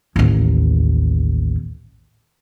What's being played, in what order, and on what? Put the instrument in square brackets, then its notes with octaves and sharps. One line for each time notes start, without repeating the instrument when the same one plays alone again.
[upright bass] A1 D#2